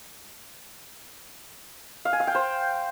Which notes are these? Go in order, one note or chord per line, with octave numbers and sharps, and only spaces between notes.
F5
G#5
F5
G5
C5